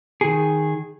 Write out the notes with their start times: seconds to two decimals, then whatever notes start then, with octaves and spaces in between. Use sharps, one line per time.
0.21 D#3 G#4